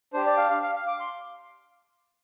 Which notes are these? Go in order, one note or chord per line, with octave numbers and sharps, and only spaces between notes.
D4 G4 C5
D5
F5
F5
F5
F5
D6
C6